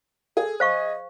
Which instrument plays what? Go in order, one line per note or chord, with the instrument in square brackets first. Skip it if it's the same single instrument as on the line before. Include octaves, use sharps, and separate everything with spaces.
[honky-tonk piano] G#4 [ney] A4
[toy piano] C5 F5 C#6 [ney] D#5